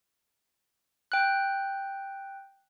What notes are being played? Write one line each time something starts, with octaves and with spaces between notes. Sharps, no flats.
G5 F#6